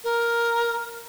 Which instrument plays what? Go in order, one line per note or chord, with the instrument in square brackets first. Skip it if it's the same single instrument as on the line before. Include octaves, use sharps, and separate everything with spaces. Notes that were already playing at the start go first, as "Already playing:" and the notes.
[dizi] A#4